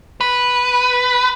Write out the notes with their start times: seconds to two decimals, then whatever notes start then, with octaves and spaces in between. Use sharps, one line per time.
0.21 B4